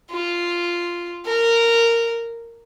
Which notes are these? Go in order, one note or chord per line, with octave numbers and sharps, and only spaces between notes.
F4
A#4